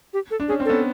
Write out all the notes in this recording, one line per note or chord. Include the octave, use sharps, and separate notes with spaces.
G4
A4
D4
C#4 G#4
C4
B3 C#4 A4